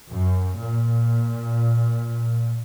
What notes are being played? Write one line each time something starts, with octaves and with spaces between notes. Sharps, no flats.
F#2
A#2